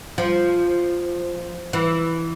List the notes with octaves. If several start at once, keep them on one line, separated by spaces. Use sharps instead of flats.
F3
E3